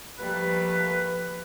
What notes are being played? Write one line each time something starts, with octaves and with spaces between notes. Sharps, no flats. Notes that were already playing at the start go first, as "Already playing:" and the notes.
F3 G3 A3 A#3 B4